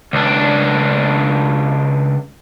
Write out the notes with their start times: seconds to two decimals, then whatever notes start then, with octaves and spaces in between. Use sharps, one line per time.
0.13 C#2 D4